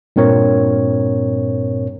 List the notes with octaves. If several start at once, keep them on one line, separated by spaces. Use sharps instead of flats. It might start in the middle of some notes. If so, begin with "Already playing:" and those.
G2 A#2 C4 A#4 C#5